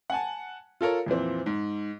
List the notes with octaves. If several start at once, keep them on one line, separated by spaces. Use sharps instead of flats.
F#5 G#5 A5
F4 A4 A#4 C#5
F2 A#2 E3 C4
G#2